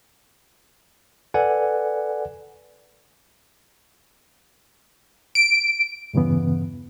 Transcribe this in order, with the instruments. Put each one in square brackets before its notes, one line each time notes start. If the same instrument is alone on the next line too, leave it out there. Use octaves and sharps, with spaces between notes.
[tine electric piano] A4 B4 D5 F#5 G#5
[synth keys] D7
[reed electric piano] E2 G2 C#3 E3 B3